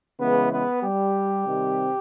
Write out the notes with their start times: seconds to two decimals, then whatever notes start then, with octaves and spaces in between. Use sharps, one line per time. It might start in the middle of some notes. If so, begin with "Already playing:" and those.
0.19 C#3 E3 G#3 B3 B4
0.52 B3 B4
0.83 G3 G4
1.46 C3 D#3 G3 C4